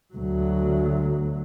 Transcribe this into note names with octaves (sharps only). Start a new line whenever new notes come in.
D2 F#3